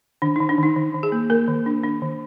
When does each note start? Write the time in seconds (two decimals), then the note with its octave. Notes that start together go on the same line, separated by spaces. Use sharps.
0.22 D#3 D4
0.36 D#3 D#4
0.49 D4
0.58 D#3 D#4
0.76 D#3
0.94 D#3
1.03 G#4
1.12 A#3
1.30 A#3 A#4
1.48 D#3
1.66 D4
1.84 D4
2.02 D#3